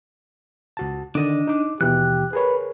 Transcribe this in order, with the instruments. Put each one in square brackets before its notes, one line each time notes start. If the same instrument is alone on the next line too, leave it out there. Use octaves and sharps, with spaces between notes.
[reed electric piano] C#2 F#4 A5
[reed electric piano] D3 D#3 D5 [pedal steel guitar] D4 D#5
[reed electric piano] D#4 D6
[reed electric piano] D#2 B2 E3 [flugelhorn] G4 [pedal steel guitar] F#6
[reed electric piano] G#4 A#4 C#5 [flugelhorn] B4